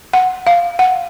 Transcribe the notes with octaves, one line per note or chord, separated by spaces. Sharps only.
F#5
F5
F#5